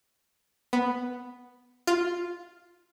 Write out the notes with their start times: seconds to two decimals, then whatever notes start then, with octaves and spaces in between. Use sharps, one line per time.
0.73 B3
1.87 F4